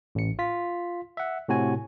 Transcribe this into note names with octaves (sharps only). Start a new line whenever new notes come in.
A1 C#7
F4 B6
E5 F#5
A2 C3 F#4 G#5